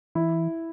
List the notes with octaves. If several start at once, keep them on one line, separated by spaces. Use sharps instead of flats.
E3 E4